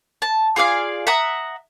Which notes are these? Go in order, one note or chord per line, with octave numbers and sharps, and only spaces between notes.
A5
F4 G#4 D5 F5
E5 F#5 A#5 D#6